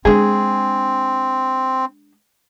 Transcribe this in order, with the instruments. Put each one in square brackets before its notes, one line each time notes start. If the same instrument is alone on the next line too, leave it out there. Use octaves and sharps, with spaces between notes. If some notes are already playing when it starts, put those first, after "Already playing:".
[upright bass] G#3 D4 [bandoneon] C4 [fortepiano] G#4